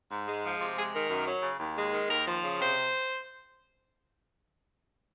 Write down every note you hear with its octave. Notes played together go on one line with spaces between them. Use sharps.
G#2
G#3
F3
C3 F4
G#3 G#4
D#3 A#4
F#2
F#3
C#3
D#2
G#3
D#3
D#2 A#4
F3
C#3
C3 C5